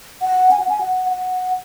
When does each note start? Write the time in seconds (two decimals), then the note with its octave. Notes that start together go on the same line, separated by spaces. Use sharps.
0.22 F#5
0.51 G#5
0.60 F#5
0.69 G#5
0.81 F#5
1.10 F#5